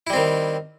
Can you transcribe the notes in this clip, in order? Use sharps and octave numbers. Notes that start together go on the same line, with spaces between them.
D#3 G3 C4 E4